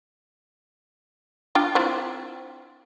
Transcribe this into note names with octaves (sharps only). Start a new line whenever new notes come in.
D4 F4 G5
C4 E4 F4